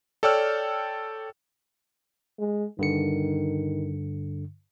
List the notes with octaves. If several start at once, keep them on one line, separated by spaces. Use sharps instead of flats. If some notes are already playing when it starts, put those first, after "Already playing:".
A4 C#5 D5 G5 E6 F6
G#3
G2 D3 D#3 C#7